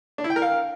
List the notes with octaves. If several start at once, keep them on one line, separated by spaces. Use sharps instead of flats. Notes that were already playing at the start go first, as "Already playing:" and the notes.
D4
E4
G5
A#4
F5